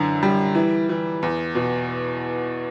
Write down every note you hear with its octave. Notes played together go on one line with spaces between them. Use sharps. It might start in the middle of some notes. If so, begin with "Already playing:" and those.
Already playing: F#2 D3 E3
G3
E3
E3
E2
B2